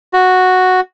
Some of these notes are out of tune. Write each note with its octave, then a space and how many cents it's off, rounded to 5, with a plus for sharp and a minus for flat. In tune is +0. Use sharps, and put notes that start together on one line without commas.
F#4 -5